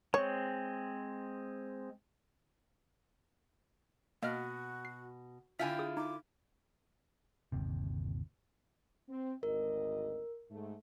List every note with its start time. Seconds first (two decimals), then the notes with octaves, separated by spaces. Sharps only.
0.14 G#3 C4 C#5
4.23 B2 A#3 F#4 D#5 F6
4.85 C7
5.59 D3 E4 F4 E5 G5 G#5
5.79 G#4 D#6
5.97 D#4 D6
7.52 G1 D#2 C3
9.09 C4
9.43 G#1 D2 A#4 D#5
10.51 G#2 A3